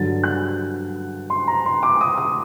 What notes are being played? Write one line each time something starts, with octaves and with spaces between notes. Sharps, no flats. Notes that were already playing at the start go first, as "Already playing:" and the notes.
Already playing: G2 D3 F#3 A6
F#6
C6
A#5
C6
D6
D#6
D#6